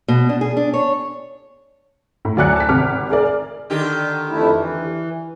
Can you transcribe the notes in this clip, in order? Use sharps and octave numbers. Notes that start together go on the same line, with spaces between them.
B2
D4
G#4
D4
C#5
A2
D2 F#3 D5 G#5 F#6 C#7
A5 B6
G#1 C3 D6 F6
G#4 A#4 D5
D3 D#3 G4
F2 A3 E4
E3